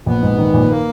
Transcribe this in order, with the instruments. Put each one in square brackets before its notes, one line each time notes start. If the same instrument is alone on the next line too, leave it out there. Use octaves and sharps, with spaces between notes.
[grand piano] A#1 [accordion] B3
[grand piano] G#2
D#3
A#1
[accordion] A#3